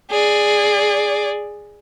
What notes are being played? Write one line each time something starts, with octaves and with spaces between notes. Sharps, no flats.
G#4 D5